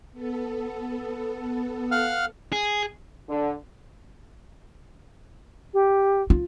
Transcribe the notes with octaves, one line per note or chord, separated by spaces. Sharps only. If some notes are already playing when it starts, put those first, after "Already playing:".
B3 A4
F5 F#5 F6
G#4
D3
G4
F4